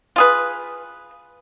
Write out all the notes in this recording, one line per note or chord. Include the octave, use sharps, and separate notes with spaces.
F4 G#4 B4